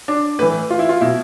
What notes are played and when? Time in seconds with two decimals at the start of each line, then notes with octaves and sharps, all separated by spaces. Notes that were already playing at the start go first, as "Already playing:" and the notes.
0.08 D4
0.39 A2 E3 B4
0.70 F4
0.79 E4
0.89 F4
1.01 B2 E4